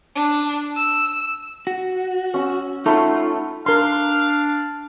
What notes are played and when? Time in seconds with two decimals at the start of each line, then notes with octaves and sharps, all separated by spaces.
0.15 D4
0.76 E6
1.67 F#4
2.34 C#4 E6
2.86 A3 D#4 F4 C#5 F#5 B5
3.66 D4 A#4 F5 C6